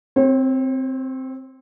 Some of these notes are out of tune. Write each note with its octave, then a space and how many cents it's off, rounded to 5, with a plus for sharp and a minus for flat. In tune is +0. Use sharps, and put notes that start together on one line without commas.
C4 +0 C#5 -45